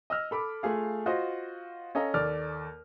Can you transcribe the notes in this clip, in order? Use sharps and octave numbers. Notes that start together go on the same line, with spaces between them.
D#5 E6 F6
A4 B5 D6
A3 F4 G#4 F5
F4 F#4 C5 D#5
C#4 A4 D#5 F5 A#5
D#2 A4 D5 F6